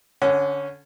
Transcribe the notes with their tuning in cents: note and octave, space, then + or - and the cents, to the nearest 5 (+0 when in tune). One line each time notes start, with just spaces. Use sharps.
D3 -20 C#4 +0 F#5 +0